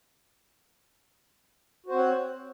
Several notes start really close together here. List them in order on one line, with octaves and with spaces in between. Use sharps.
F#4 C5 C4 F#5 C#5